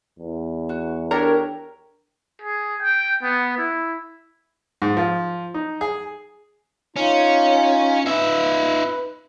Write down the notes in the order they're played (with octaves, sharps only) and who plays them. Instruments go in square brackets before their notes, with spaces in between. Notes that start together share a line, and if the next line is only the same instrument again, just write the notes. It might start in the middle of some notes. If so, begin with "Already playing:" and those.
[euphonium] E2
[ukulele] F#4
[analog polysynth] D4 A#4 C#5 [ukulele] G4 A4 A#5
[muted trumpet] G#4
G5
B3
E4
[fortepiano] G#2
F3
D#4
G#4
[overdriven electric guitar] C#4 [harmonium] D#4 F4
[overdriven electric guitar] D#4 E5 [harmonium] B4